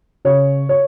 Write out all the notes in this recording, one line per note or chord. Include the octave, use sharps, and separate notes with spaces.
C#3 C#5
C#5